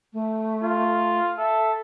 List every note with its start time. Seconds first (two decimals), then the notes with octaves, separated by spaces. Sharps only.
0.13 A3
0.62 F4
1.38 A4 E5